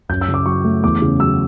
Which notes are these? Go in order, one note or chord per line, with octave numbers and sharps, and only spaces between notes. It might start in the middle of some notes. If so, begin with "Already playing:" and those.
F#2 G6
E6
C#3
D6
F#3 C#6
A3
E2 D6
C#3
F#3 E6